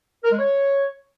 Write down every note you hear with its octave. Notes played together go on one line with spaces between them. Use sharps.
A#4
G#3
C#5